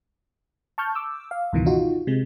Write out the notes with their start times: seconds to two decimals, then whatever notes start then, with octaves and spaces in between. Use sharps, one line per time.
0.78 A5 C#6 F6 G6
0.95 D6 E6
1.31 F5
1.53 C#2 G2 B2 D#3 E3
1.66 D#4 F4 F#4
2.07 C3 G#3